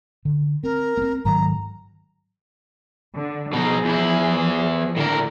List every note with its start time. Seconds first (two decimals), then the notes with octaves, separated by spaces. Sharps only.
0.25 D3
0.64 C4 A#4
0.97 B3 C4
1.25 G#2 D#3 F#3 A#5
3.13 D3
3.53 B2 F3 D#4 G#4
3.85 E2 E4
4.96 A2 D3 A#4